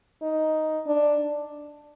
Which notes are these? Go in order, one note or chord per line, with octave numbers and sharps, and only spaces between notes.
D#4
D4